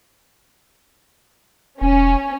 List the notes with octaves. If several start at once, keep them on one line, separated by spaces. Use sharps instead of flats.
E1 C#4